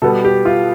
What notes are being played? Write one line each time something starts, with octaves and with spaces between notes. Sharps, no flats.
B2 G3 B3 A4
G4
F4